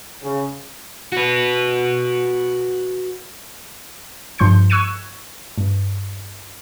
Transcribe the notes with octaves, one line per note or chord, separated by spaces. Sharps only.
C#3
F#4 B4
G2 F3 C6 G6 C#7
C#6 E6 F#6 G#6 C#7 D#7
G2